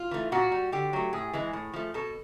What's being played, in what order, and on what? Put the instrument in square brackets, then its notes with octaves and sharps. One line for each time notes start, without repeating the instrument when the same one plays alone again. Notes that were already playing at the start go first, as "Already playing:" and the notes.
Already playing: [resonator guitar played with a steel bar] F4
E3 A3
A#2 F#4
G3
D3 G4
F#3 A3
A2 G#4
E3 G#3
A2
F3 A3
B2 A4